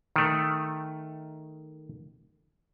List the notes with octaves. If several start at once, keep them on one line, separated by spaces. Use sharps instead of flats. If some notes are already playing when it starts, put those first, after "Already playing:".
D#3 A3